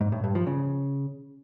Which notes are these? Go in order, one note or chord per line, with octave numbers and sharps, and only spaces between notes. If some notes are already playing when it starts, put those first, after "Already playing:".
G#2
A2
G2
F3
C#3